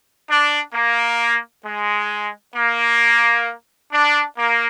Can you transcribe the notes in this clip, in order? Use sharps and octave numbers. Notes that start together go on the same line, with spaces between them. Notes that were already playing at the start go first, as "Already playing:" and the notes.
D4
A#3
G#3
A#3
D4
A#3